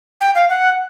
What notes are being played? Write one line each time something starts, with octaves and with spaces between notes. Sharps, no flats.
G5
F5
F#5